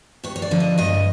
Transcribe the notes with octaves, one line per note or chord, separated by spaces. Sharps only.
G2 C#5
C#5
D5
D3 F3
D#5
G2 D#5